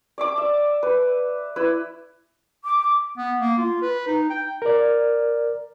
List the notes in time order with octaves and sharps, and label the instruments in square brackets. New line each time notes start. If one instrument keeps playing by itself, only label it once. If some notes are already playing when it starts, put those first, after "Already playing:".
[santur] D5 E5 D6
E5
B4
E4 B4 E6
[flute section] D6
[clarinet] B3
A#3
F4
B4
D#4
G5
[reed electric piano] A#4 D5